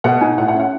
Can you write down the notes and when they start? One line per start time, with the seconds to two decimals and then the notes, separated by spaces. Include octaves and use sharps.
0.04 B2 F#5
0.21 D#4 G#5
0.38 A2 F#5
0.48 F#5
0.54 C#4
0.60 F#5